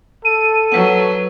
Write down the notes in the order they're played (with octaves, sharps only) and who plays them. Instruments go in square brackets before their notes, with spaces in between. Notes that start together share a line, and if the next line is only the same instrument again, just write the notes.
[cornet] A4 [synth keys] D#7
[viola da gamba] F#3 [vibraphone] B4 F#5